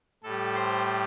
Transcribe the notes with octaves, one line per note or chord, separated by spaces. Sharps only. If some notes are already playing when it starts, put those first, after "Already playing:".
A2 G3 A4
C5